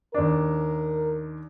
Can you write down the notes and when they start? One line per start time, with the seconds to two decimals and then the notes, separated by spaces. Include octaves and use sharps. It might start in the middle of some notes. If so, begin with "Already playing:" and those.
0.14 D#2 D4 A#4